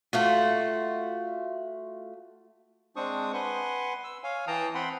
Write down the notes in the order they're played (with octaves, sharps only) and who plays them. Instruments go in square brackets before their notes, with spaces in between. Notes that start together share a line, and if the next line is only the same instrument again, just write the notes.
[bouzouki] A3 F4 F#4
[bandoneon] G#3 C4 D4 C5 C#6 D#6
B4 F#5 G#5 C6
E6
C#5 F5 G#5
E3 G5 A5 A#5 D#6
C4 F#5 G5 B5 C6